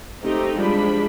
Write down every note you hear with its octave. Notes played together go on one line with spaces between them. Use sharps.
A3 C4 D#4 G4
F3 G3 G#3 D4 B5